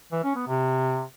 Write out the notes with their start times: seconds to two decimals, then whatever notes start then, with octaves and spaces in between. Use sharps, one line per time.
0.12 E3
0.24 C#4
0.36 B3
0.47 C3